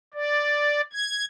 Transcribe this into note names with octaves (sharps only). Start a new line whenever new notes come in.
D5
G#6